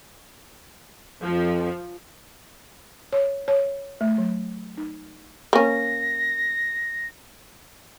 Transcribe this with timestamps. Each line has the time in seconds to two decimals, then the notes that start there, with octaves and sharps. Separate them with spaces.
1.22 F2 F3
3.13 C#5
3.48 C#5
4.01 A3
4.18 F#3
4.78 D#4
5.53 A#3 C#4 A#6